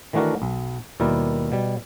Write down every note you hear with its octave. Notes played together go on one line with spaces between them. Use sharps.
D#3 E3 A3 D4 F#4 A#4
B1
D#2 B2 G3 E4 A#4
B2 G3